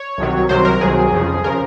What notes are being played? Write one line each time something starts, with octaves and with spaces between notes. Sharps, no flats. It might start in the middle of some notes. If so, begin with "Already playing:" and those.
Already playing: C#5
C2 C3 D#3 F#3
C2 C3 D#3 F#3 C5
A#4
C2 C3 D#3 F#3 G#4
F2 C#3 F3
C#3 F3 A#4